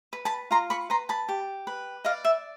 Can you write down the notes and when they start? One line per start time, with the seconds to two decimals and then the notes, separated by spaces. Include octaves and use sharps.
0.13 B4
0.25 A5 B5
0.51 F4 A#5 C6
0.70 B5 C#6
0.90 B4 A#5 C6
1.09 A5 B5
1.29 G4
1.67 B4
2.05 D5 D#5 F5
2.25 E5